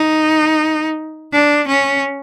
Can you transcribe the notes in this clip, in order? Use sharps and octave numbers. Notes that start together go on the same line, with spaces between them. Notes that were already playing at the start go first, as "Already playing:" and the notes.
Already playing: D#4
D4
C#4